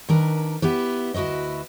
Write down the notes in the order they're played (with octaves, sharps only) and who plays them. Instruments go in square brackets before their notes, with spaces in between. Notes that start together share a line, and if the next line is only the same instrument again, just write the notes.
[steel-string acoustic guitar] D#3 D4 A#4 B4
B3 E4 G4 B4
D2 E4 F#4 B4 D#5